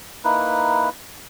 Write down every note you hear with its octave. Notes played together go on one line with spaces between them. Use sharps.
A#3 D#4 E4 B4